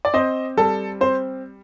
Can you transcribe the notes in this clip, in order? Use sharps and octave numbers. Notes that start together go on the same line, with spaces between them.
D5
C4 C5 D#5
G3 A4
C4 C5